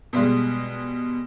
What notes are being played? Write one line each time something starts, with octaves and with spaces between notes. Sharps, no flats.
B2 G3 G#3